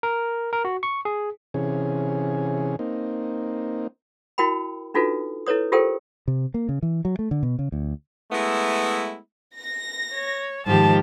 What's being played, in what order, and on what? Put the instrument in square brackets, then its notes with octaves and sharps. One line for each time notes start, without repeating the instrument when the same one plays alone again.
[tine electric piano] A#4
A#4
F#4
C#6
G#4
[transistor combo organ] C3 E3 C#4 G#4
A#3 C4 D#4
[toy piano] E4 F#4 A#4 G5 B5
D4 D#4 F4 F#4 A4 B4
E4 A4 B4 C#5 D#6
F4 G4 A4 A#4 C5 G5
[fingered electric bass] C3
A#3
C#3
E3
F#3
A3
D3
B2
C#3
D2
[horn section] G#3 A3 B3 E4
[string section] A#6
[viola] C#5
[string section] G#2 D#3 [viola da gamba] F3 G4 [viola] A5